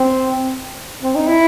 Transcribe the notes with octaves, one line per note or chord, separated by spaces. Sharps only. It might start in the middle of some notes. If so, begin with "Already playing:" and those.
Already playing: C4
C4
D#4
E4